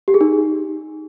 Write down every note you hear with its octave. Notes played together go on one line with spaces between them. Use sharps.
G4
G#4
D#4